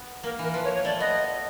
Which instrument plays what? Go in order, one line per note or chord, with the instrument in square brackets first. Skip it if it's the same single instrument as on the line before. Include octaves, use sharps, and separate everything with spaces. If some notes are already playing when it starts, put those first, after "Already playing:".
Already playing: [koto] B3
[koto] A#3 [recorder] A#4
[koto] E3 [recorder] A#4
[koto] F3 [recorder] B4
[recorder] C#5
C#5
[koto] A3 [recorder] D5
[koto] B3 [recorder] D#5